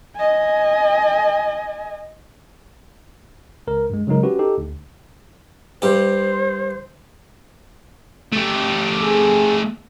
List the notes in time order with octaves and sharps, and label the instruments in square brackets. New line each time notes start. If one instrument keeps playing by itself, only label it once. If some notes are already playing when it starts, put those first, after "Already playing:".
[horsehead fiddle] D#5 G#5
[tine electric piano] C#2 A#4
G2 G#3
C#3 F#3 G#3 D#4 A#4
C#4 F#4 G4 B4
D#4 G4 A4
D2
[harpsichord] G2 G4 [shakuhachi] C5
[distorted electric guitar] A3 G4
[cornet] G#4